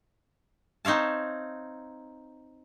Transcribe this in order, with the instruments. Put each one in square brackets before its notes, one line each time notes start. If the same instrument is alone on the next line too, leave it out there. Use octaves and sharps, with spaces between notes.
[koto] C4 D#4 C#5 F5 A5